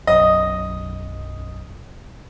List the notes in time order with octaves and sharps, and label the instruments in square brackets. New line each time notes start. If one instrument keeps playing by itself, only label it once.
[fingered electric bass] B1 F#2 [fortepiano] D#5